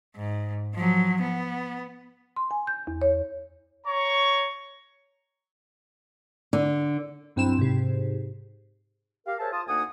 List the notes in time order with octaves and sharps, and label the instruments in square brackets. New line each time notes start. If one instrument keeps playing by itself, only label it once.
[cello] G#2
F3 F#3
B3
[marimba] C6
G#5
G6
E2
C#5
[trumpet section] C#5 A#5 C#6
[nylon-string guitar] D3
[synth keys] B1 G2 C4 E4 E7
G#2 C3
[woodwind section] G4 A#4 F5
G#4 A#4 C5 C#5 E5 A5
F4 A5 D#6
D2 A#3 D#4 F#5 G#5 D#6